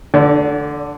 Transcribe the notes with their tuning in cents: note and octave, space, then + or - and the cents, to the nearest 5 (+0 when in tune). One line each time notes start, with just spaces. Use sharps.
D3 +0 D5 -40